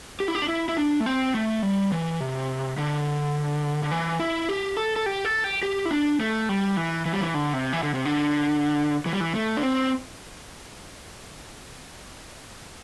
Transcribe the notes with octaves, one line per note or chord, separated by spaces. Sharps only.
G4
E4
G4
D4
E4
E4
D4
A3
C4
A3
G3
E3
C3
D3
D3
E3
E4
G4
A4
A4
G4
A4
G4
G4
E4
D4
A3
G3
E3
E3
G3
E3
D3
C3
E3
D3
C3
D3
E3
G3
E3
A3
D4
C4